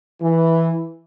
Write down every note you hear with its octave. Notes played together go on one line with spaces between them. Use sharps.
E3